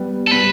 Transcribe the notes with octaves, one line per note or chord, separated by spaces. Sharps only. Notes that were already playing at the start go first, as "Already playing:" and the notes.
Already playing: G3 B3
A4
G3 B3 B4